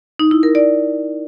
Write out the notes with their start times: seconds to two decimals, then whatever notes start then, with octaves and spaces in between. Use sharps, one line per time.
0.19 D#4
0.31 E4
0.43 A#4
0.55 D5